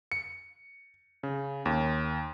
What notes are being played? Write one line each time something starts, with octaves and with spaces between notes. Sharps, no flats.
C#7
C#3
D#2